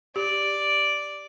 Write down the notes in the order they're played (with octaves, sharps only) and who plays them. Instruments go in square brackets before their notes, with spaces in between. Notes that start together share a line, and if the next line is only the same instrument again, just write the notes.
[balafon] G4 [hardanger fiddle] D5